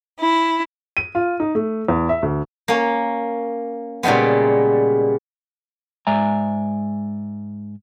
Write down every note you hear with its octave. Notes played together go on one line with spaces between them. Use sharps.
E4
D#7
F4
D#4
A3
E2
E5
D2
A#3 C#4
A#2 C#3 G3 G#3 B3
G#2 G#3 D5 E5 G#5 A#5